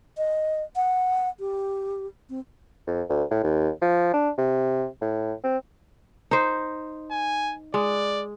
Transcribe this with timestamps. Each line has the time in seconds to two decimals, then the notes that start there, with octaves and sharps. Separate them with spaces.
0.17 D#5
0.76 F#5
1.40 G4
2.29 C4
2.87 F2
3.09 D2
3.31 A2
3.44 D#2
3.82 F3
4.14 D4
4.38 C3
5.02 A2
5.44 C4
6.31 D#4 C5
7.11 G#5
7.74 G#3 D5